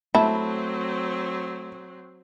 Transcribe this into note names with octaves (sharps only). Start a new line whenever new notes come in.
F#3 A3 C4 E4 A5